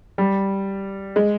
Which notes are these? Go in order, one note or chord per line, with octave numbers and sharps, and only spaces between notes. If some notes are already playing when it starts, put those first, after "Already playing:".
G3
G#3